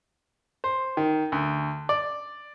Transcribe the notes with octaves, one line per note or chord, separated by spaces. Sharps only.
C5
D#3
D2
D5